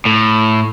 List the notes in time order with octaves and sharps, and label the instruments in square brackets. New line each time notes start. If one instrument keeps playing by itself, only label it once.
[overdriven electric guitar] A2